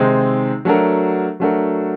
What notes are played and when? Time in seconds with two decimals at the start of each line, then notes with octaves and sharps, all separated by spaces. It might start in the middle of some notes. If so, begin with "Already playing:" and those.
Already playing: C3 D#3 G#3 C4 D#4
0.65 F#3 A3 D4 F#4 A#4
1.40 F#3 A3 D4 F#4 A#4